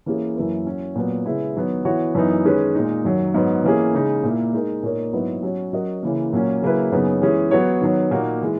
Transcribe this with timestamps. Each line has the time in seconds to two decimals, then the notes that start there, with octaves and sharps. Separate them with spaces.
0.06 E3 A#3 C#4 G#4
0.36 F#2 E3 A#3 E4 B4
0.66 F#3 C#4 E4
0.95 A#2 F#3 B3
1.26 C#3 G#3 B3 E4
1.56 D#3 F#3 B3
1.85 E3 B3 F#4 C#5
2.15 F#2 E3 B3 D#4
2.45 D#3 G#3 C#4 G#4 B4
2.75 A#2 G#3 D#4
3.05 F#2 D#3 F#3
3.34 G#2 F#3 B3
3.64 E3 A#3 C#4 G#4
3.94 C#3 G#3 D#4
4.23 A#2 A#3 E4
4.54 G#3 D#4 A#4
4.83 A#2 A#3 D#4 A#4 C#5
5.13 G#2 F#3 B3 E4 B4
5.43 F#3 C#4 F#4
5.73 F#3 C#4 F#4 A#4 D#5
6.03 C#3 E3 A#3
6.33 A#2 F#3 A#3 C#4
6.62 C#3 F#3 A#3 E4 B4
6.92 F#2 C#3 F#3 B3 D#4
7.22 E3 G#3 C#4 G#4
7.51 F#3 B3 F#4 C#5
7.81 D#3 F#3 B3
8.11 A#2 A#3 D#4 F#4
8.42 E3 G#3